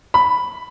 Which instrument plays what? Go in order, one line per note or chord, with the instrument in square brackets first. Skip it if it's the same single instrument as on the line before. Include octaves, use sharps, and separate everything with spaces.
[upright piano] B5